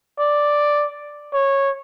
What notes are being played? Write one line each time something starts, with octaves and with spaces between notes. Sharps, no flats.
D5
C#5